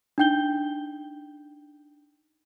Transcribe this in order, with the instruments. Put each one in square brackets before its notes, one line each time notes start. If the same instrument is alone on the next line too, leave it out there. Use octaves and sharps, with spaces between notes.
[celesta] D4 D#4 G5 G6 G7